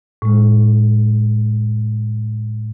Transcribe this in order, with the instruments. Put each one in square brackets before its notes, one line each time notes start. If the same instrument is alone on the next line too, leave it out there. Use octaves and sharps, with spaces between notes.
[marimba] A2 G#3